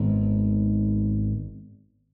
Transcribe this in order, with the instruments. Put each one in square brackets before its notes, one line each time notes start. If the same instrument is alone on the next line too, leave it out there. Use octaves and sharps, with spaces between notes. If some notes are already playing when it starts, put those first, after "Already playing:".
Already playing: [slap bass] G#1 G#2 B3